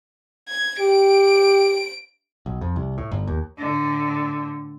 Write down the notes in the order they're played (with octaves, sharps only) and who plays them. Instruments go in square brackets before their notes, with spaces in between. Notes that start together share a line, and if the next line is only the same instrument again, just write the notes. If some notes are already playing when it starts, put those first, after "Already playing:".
[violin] G#6
[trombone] G4 [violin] D7
[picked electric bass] B1
F2
C2
A2
G1
D#2
[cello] A2 D3